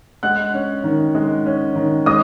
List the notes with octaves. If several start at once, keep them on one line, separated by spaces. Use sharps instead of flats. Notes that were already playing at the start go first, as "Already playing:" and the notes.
G#3 F#5 F#6
C#4
D#3
G#3
C#4
D#3
G#3 D#5 D#6